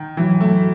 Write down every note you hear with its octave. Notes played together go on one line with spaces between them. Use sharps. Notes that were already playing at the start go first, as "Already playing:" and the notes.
Already playing: D#3
E3 F#3
A3